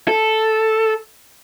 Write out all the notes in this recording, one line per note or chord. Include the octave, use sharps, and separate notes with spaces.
A4